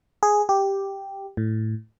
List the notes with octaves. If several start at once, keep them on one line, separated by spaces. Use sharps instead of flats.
G#4
G4
A2